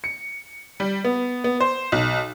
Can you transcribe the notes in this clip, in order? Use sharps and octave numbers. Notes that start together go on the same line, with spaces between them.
C#7
G3
B3
B3
C5
B1